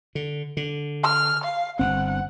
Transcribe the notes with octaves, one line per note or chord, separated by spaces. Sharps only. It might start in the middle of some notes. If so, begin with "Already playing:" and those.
D3
D3
F6
F5
G1 C4 F#5